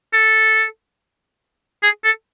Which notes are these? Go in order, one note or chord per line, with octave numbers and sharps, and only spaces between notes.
A4
G#4
A4